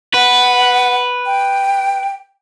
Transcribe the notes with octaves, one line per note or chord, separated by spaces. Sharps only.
B4 F#5
G5